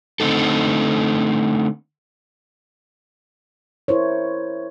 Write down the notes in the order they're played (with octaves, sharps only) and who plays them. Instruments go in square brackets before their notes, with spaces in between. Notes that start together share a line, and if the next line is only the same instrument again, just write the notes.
[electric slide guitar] D3 A3 C4 D#4 A4
[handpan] E4 A#4 C5 C#5